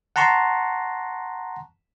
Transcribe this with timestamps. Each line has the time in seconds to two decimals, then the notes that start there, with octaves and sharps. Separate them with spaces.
0.16 F#5 A5 A#5 C6 C#6